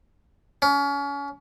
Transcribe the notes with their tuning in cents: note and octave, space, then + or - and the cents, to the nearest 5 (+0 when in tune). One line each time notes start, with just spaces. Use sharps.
C#4 +30